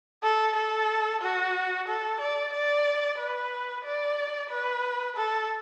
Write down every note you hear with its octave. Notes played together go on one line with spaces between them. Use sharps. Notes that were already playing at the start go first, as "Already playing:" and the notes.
A4
A4
F#4
A4
D5
D5
B4
D5
B4
A4